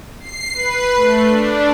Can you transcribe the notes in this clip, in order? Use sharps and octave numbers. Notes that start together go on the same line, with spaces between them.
C7
B4
A3
D4